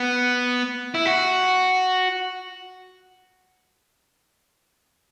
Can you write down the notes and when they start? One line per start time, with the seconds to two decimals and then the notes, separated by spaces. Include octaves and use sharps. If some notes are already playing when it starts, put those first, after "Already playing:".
Already playing: B3
0.95 E4
1.06 F#4